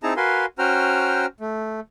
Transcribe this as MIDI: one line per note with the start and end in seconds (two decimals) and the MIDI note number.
0.03 0.14 60
0.03 0.14 63
0.03 0.14 64
0.03 0.14 68
0.03 0.14 81
0.03 0.14 82
0.17 0.46 66
0.17 0.46 70
0.17 0.46 71
0.17 0.46 77
0.17 0.46 80
0.17 0.46 84
0.59 1.26 61
0.59 1.26 66
0.59 1.26 72
0.59 1.26 79
0.59 1.26 82
0.59 1.26 89
1.40 1.80 57